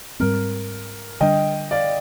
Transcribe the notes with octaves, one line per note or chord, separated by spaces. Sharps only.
G#2 G3 C4 A#4
D3 G3 D4 D#5 G5
D5 F5